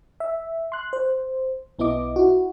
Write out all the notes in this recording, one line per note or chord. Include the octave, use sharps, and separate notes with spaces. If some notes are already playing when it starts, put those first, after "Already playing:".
E5
C6 F#6
C5
B1 B3 E4 D#5 D6
E4 F#4